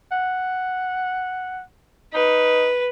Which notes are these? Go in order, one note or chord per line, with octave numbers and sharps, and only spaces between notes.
F#5
D#4 B4